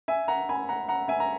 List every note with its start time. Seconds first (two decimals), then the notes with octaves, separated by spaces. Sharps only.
0.08 E5 G#5
0.28 F#5 A#5
0.49 G#5 B5
0.69 F#5 A#5
0.88 F#5 A#5
1.08 E5 G#5
1.20 A#5